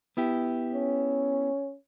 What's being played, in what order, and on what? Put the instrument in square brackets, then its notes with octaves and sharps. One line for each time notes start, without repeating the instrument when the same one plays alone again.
[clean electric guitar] B3 E4 G4
[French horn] C#4